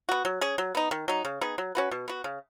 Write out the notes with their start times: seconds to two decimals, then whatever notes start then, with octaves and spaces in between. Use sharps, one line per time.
0.09 B3 F#4
0.25 F#3
0.41 C#4 G#4
0.58 F#3
0.75 B3 D#4
0.91 D#3
1.08 F#3 D#4
1.25 C#3
1.41 B3 D#4 G#4
1.58 F#3
1.75 C#4 F#4 B4
1.91 B2
2.08 B3 F#4
2.24 C#3